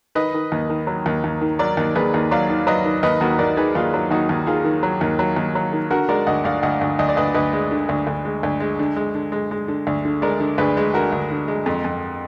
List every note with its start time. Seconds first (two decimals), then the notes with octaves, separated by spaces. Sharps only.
0.15 D#3 B4 D#5
0.34 D#3
0.52 D#2
0.70 D#3
0.87 F#3
1.06 D#2
1.24 D#2
1.41 D#3
1.59 F#3 A#4 D5
1.77 D#2
1.95 D#2 G#4 B4
2.14 D#2
2.31 F#3 D5 F5
2.49 D#3
2.67 F#3 B4 D#5
2.85 D#3
3.03 D#2 B4 D#5
3.21 D#2 F#4 A#4
3.39 D#2 A#4 D5
3.57 D#3 G#4 B4
3.75 D#2 F4 G#4
3.94 F#3
4.11 D#2 D#4 F#4
4.29 D#2
4.47 D#3 F4 G#4
4.65 D#3
4.83 F#3
5.01 D#2
5.19 F#3
5.36 D#2
5.55 F#3
5.73 D#3
5.91 D3 F#4 A#4
6.09 G#3 A#4 D5
6.27 D2 D#5 F#5
6.44 D2 D5 F5
6.63 D2 D#5 F#5
6.81 D2
6.99 D2 D#5
7.09 D5
7.17 D2 B4 D#5
7.35 D2 B4 D#5
7.53 G#3
7.71 D3
7.89 D2
8.07 D2
8.25 G#3
8.43 D2
8.60 G#3
8.79 D3
8.96 G#3
9.15 D3
9.32 G#3
9.51 G#3
9.68 D3
9.87 D2
10.05 D3
10.22 G#3 A#4 D5
10.40 D3
10.58 D2 G#4 B4
10.77 G#3
10.94 D3 F#4 A#4
11.12 D2
11.31 D3
11.48 G#3
11.66 F2
11.84 F2